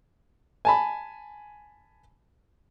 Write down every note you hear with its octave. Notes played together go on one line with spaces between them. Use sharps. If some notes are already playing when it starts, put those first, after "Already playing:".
G#5 A5 B5